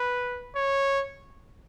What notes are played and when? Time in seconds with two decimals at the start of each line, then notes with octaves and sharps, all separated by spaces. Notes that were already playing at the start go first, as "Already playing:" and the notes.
Already playing: B4
0.56 C#5